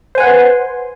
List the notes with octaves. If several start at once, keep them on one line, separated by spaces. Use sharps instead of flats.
B4 C5 F#5 G#5 C6